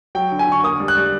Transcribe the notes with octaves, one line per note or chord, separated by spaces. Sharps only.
F#3 G5
D3
G#5
D3 C#6
A#3 D#6
G3
F#6
G3